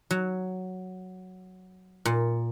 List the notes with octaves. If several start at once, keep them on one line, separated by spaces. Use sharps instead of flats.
F#3
A#2